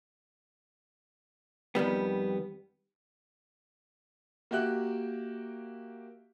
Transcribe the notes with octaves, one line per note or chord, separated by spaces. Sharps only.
F2 D#3 G3 B3
A#3 F#4 G4 E5 F#6